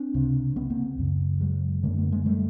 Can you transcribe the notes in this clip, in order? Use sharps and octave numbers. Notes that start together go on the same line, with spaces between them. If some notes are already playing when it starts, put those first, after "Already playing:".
Already playing: C4 D4
C#2 C3
B3 C#4
A#3 C4
F#2 C#3
F#3 G#3
F#2 D3 G#3 A#3
A3 B3
G#3 A#3
G3 A3